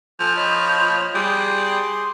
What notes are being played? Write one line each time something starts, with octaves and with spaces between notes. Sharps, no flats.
F3 A4 G#5
C#5 D#5 B5
G3 G#4 C6